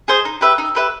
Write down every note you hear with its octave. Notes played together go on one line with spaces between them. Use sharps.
G#4 C5 D#5
D#4
G4 B4 E5
D#4
G4 B4 E5